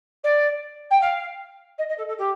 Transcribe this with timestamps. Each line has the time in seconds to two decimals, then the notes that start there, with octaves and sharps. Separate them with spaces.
0.23 D5
0.90 G5
1.01 F5
1.78 D#5
1.88 D#5
1.97 A4
2.08 A4
2.18 G4